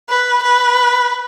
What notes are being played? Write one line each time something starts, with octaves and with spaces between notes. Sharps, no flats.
B4
B4